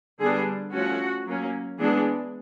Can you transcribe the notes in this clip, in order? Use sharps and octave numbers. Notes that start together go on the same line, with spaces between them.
D3 G3 B3 D4 G#4
F3 A3 C#4 F#4
F#3 A#3 C#4
E3 G#3 B3 D4 G#4